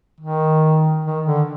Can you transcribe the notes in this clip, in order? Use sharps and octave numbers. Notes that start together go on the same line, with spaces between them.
D#3
D#3
D3